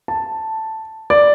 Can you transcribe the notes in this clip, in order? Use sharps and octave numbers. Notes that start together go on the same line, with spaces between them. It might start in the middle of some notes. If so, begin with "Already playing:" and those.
A5
D5